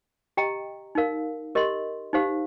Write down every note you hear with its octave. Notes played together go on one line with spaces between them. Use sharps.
G4 D#5 G5 A#5
D#4 A#4 F5
G4 A#4 D#5 C6
D#4 G4 C5 F5